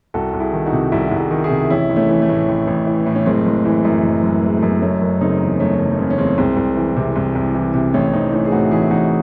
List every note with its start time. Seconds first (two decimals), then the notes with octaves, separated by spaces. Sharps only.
0.14 C2 F#4 A4
0.34 C2
0.40 E4 G#4
0.53 D#3
0.66 D#4 F#4
0.72 C3
0.92 C2 E4 G#4
1.09 C2 F#4
1.18 E4 G#4
1.31 D#3
1.44 E4 G#4
1.51 C3
1.70 A1 C#4 E4
1.90 A1
1.96 A3 C#4
2.09 E3
2.22 A3
2.29 A2
2.48 A1
2.67 A1
2.87 E3
3.06 A2
3.15 C#4
3.26 F#1 G#3 C4
3.46 F#1
3.65 E3
3.85 F#2
4.04 F#1
4.23 F#1
4.43 E3 G#3
4.57 A3
4.63 F#2
4.69 C4
4.82 F#1 A3 C#4
5.01 F#1
5.21 C#3 C4 D#4
5.41 E2
5.60 F#1 A3 C#4
5.79 F#1 A3
5.91 A3
5.99 C#3 G#3 C4
6.10 C#4
6.18 E2 G#3 C4
6.38 C2 G#3 C4
6.57 C2
6.77 E3
6.96 C3
7.16 C2
7.35 C2
7.55 E3
7.74 C3
7.94 A1 A3 C#4
8.13 A1 C4 D#4
8.32 E3 A3 C#4
8.45 G#4
8.52 A2 D#4 F#4
8.71 A1 E4 G#4
8.91 A1 D#4 F#4